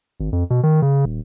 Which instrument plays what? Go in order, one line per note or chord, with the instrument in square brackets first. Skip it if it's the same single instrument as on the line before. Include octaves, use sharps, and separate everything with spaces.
[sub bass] G#1
F2
B2
D#3
C#3
D#1